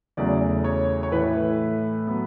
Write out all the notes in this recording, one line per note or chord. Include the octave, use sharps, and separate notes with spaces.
E2 C#3 F#3 A3 D5
C#5
C#5
A2 E3 A3 B4
F#3 B3